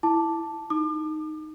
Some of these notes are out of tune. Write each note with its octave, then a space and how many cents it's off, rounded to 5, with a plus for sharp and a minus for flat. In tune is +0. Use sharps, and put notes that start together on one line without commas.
E4 +0 A5 +0 D6 +0
D#4 +0 D6 +40